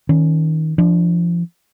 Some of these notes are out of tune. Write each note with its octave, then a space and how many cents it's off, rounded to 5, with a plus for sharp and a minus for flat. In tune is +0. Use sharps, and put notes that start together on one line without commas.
D#3 +25 C#4 +0
F3 -25 D4 +0